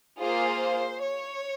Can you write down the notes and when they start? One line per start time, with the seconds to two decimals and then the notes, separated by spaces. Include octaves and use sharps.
0.19 A#3 F4 G#4 C5
1.01 C#5